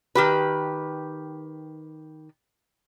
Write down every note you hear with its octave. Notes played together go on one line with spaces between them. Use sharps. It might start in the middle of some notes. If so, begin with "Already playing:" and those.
D#3 G4 B4